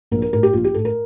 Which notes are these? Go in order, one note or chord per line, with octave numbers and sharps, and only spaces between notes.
A#1 A#4
A#4
A2 A#4
G4
A#1 F4
G4
A2 A4
A#4